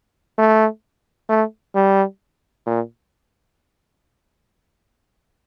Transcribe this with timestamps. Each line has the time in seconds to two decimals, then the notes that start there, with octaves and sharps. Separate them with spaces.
0.38 A3
1.29 A3
1.75 G3
2.66 A#2